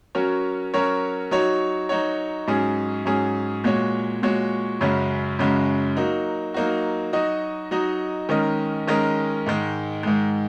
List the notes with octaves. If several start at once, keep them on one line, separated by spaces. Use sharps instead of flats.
F#3 C#4 F#4 A#4 C#5
F#3 C#4 F#4 A#4 C#5
F#3 D#4 F#4 C#5
F#3 D#4 F#4 C#5
G#2 F#3 C#4 G#4
G#2 F#3 C#4 G#4
A#2 G#3 F#4 C#5
A#2 G#3 F#4 C#5
F#2 C#3 G#3 C#4 F#4
F#2 C#3 G#3 C#4 F#4
F#3 A#3 D#4 F#4
F#3 A#3 D#4 F#4
F#3 D#4 F#4 D#5
F#3 D#4 F#4 D#5
D#3 G#3 C#4 A#4 D#5
D#3 G#3 C#4 A#4 D#5
G#2 D#3 G#3
G#2 D#3 G#3